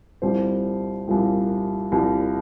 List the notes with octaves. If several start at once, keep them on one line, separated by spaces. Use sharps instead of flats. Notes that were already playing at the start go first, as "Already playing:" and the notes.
C2 A#2 G3 C5
C2 A#2 G3
C2 A#2 G3